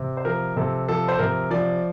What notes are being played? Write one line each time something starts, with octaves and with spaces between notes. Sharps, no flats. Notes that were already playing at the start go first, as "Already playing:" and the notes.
Already playing: C3
C5
F3 A#4
C3 A4
F3 A4
C5
C3 A#4
F3 D5